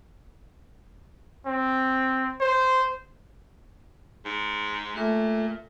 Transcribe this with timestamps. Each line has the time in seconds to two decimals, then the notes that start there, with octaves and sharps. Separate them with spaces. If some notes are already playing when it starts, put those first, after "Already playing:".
1.46 C4
2.40 C5
4.25 G#2
4.96 A#2 A3